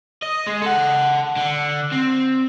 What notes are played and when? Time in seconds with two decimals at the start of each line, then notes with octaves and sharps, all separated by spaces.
0.22 D#5
0.47 G#3
0.62 A4 F#5
1.37 D3
1.92 C4